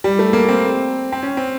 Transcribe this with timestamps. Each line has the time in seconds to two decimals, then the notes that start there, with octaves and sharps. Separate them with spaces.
0.04 G3
0.19 A3
0.33 A#3
0.48 C4
1.12 C4
1.23 C#4
1.37 C4